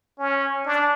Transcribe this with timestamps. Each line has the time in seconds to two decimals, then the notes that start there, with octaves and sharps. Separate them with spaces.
0.19 C#4
0.65 D4